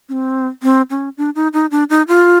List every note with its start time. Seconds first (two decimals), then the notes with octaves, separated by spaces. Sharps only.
0.09 C#4
0.12 C4
0.63 C4
0.90 C#4
1.17 D4
1.35 D#4
1.53 D#4
1.71 D4
1.90 D#4
2.08 F4